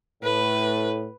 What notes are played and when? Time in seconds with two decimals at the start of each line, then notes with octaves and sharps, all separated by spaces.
0.23 A2 B4